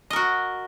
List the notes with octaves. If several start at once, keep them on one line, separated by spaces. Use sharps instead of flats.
F#4 A#4 D#5